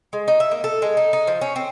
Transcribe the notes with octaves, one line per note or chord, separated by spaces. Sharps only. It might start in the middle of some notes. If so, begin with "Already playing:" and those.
G#3
D#4
E5
A#3
A4
G#3
D#4
D#4
F3
C#4
C4